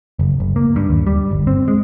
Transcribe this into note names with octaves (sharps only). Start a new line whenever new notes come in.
F#1
F#1
A#3
G2
D#2
G3
G1
C4
G#3